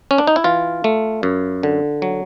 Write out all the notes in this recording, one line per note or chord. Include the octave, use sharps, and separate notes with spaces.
C#4
D4
D#4
E4
E3 F4
A3
F#2
D3
F#3